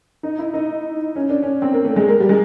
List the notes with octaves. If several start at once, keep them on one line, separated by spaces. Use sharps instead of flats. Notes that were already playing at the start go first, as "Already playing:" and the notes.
D#4
E4
D#4
C#4
D4
C#4
C4
A#3
A3
G#3
A#3
G3
G#3